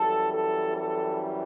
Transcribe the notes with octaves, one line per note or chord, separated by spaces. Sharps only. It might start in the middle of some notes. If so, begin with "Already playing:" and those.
Already playing: F#2 E3 G3 A4
A4
A4